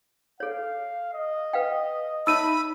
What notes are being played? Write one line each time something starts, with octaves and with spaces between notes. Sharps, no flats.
A4 C#5 F5
D#5
B4 F5 G5
D#4 C#5 E5 B5 E6 D#7